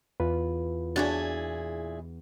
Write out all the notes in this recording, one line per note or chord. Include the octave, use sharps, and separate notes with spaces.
E2 F4 B4
A#2 D4 E4 F#4 G#4 C#5 A6